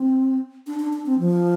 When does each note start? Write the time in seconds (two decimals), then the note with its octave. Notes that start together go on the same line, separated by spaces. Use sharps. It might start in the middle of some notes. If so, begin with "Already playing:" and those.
Already playing: C4
0.67 D4
0.80 D4
0.93 D4
1.06 C4
1.19 F3